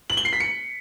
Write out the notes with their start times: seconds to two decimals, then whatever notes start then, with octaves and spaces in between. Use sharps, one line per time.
0.10 F#7
0.17 G7
0.25 C7
0.33 B6
0.40 C#7